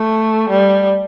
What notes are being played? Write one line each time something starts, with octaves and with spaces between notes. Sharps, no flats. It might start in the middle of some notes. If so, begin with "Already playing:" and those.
Already playing: A3
G3